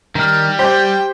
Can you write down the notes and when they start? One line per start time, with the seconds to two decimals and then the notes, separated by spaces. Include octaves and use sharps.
0.15 D#3 G3 F6
0.59 G4 C5 G5 G6